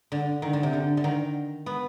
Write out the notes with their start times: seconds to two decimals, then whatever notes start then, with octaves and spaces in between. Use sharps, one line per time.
0.12 D3
0.42 D#3
0.53 D3
0.63 C3
0.73 D3
0.97 D3
1.04 D#3
1.66 B3